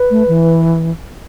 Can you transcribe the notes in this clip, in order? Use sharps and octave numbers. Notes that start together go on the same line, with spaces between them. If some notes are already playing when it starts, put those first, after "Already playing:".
Already playing: B4
A3
E3